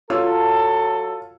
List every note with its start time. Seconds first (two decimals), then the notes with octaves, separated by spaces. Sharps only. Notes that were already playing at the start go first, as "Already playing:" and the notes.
0.10 F#3 F4 A4 C#5 E6